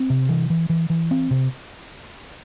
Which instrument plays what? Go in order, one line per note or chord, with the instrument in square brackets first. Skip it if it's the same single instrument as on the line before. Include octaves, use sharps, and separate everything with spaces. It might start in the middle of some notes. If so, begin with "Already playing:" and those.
Already playing: [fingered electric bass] C4
C3
E3
E3
E3
E3
C4
C3